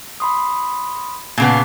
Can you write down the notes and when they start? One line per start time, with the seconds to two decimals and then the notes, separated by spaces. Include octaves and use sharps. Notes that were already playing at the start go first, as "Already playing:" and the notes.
0.20 B5 C6 D#6
1.38 A#2 C#3 B3